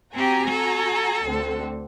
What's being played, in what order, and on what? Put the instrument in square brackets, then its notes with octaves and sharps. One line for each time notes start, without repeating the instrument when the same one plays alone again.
[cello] C4 G4 [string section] F#4 G#5 A#5
[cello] A4
[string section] D2 D3 C4